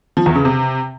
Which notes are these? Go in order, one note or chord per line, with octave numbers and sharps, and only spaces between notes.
F3
E2
C#3
C3